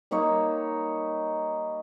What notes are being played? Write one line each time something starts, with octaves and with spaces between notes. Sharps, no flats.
G3 A#3 D#4 C#5